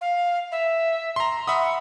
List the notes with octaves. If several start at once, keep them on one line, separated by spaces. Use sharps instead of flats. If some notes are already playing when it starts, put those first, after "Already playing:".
F5
E5
A#5 C6
E5 F#5 B5 D#6